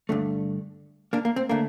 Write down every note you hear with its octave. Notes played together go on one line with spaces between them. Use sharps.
G2 D3 A3
A#3 D4
A#3
C4
D3 A3 A#3 D4